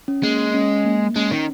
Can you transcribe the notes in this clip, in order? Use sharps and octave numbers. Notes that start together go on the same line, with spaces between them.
C#4
G#3 A#3
C#4
A#3
G#3 C#4
D#3